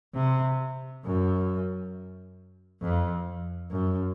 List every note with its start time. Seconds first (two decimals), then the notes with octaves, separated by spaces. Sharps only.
0.15 C3
1.04 F#2
2.82 F2
3.71 F#2